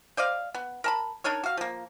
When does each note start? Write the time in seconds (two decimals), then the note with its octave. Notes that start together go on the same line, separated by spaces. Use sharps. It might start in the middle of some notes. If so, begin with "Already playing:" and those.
0.17 C5 D5 D#5 F5
0.54 B3
0.84 A#4 A5 B5
1.24 D4 D#4 A#4 C#5
1.44 F#4 F5
1.57 F3 A#3